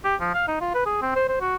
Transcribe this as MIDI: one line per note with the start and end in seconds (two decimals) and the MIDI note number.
0.04 0.15 67
0.20 0.31 53
0.34 0.45 77
0.48 0.57 63
0.61 0.73 65
0.74 0.84 71
0.86 0.97 68
1.02 1.15 60
1.16 1.24 72
1.29 1.41 72
1.41 1.56 66